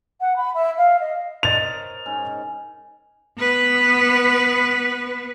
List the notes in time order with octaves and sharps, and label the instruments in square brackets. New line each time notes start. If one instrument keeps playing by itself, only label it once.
[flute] F#5
B5
E5
F5
D#5
[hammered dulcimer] A#4 C5 C#5 [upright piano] D#5 A6 F7
[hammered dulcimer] G#2 C#4
[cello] B3 B4